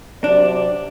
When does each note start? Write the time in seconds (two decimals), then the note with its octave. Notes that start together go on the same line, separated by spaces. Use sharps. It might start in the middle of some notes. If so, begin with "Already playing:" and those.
0.24 C3 F#3 D4 D5